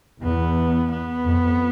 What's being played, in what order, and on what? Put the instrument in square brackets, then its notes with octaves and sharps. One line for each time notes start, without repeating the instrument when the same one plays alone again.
[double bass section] E2 [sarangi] B3
[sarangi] B3
[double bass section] F2